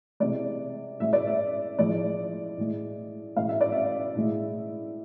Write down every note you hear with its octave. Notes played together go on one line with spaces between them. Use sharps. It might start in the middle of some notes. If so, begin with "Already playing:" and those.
C3 E3 G#3 D5
A2 G#3 E5
D5
E5
A2 F3 G#3 D5
A2 G#3
A2 E3 G#3 F5
E5
D5
E5
A2 G#3